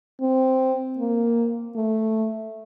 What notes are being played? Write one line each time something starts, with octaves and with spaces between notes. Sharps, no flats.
C4
A#3
A3